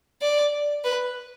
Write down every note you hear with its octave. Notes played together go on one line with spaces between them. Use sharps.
D5
B4